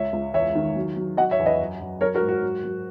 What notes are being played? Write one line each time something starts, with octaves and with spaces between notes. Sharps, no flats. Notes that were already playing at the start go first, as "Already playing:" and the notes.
Already playing: C#2 C#5 E5
C#2
E2 C#5 E5
D#3
F#3
F#3
F#3 D#5 F#5
C#5 E5
E2
B4 D#5
F#2
F#2
F#3 A#4 C#5
F#4 A#4
G#2
F#4
F#3
F#3